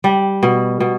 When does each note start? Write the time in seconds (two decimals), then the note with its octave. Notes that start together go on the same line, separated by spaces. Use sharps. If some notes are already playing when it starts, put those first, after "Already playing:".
0.04 G3
0.43 B2
0.80 B2